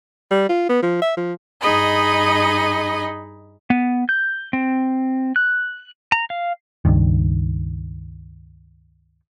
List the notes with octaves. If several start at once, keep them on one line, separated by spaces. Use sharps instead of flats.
G3
F4
B3
F3
E5
F3
G2 D#4 G#4 D#5 B5
B3
G6
C4
F#6
A#5
F5
C#2 G2 D#3